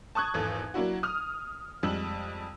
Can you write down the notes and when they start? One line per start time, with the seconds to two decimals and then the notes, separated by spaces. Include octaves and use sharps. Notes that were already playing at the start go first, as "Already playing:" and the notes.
0.15 A5 C#6 D#6 F#6 G#6
0.34 G#1 E2 A4
0.74 F#3 A#3 D4 E4 F#4
1.03 D#6 F6
1.83 F2 G3 G#3 E6 F#7